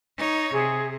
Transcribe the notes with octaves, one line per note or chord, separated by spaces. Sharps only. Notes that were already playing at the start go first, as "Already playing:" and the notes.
D#4 C#5
C3 G#4